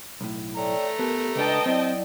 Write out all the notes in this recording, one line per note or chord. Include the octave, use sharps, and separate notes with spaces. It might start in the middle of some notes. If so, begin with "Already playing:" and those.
B1 A2
A3 C#5 D5 G5 A#5
B3 G4 A#4 A5
C#2 D4 B4 D#5 G5 A5
F#3 C4 E4 D5